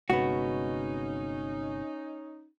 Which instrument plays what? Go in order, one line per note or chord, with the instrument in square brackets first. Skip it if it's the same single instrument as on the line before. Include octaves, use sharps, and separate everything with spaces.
[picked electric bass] G1 C3 G#3 [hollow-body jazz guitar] B3 F#4 [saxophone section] C#4 D#4